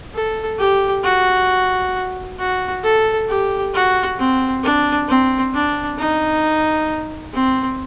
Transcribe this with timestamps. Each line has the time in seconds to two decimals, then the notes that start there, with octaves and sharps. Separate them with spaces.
0.14 A4
0.59 G4
1.04 F#4
2.38 F#4
2.83 A4
3.29 G4
3.73 F#4
4.19 C4
4.63 D4
5.08 C4
5.54 D4
5.98 D#4
7.33 C4